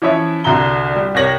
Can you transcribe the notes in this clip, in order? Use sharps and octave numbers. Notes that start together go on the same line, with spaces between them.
E3 F3 C#4 E4 C#5 E5
C2 D3 F#4 E5 A#5 G7
G3
C2 G4 A#4 C#5 A#6 F#7